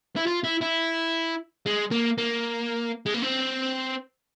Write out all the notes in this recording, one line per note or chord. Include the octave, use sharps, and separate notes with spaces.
E4
F4
E4
E4
G#3
A#3
A#3
G#3
A#3
C4